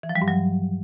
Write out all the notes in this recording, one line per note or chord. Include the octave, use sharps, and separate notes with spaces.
E3
F3
G3
G2
F#3